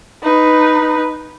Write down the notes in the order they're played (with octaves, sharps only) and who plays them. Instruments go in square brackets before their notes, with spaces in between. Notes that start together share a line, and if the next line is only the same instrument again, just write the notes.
[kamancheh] D#4 B4